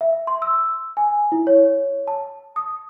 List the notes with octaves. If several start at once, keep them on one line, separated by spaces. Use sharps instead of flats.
E5
C6
E6
G#5
E4
C#5
A5
D#6